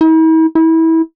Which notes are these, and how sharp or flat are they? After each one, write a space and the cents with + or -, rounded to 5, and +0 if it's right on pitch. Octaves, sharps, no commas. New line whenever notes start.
E4 -45
E4 -25